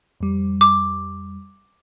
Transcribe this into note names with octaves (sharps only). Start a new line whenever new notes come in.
F2 G3
D6